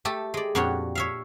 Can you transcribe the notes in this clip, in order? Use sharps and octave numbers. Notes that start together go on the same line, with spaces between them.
A3 G4 A4
G#3 D5
F2 A#2 D4 F#4 G4 C#5
C#5 E5 F5